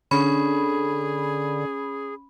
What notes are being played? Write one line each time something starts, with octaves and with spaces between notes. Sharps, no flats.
D3 C#4 G#4 B5